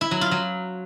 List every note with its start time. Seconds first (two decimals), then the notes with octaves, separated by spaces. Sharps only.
0.01 E4
0.11 F#3
0.21 F4
0.31 F#3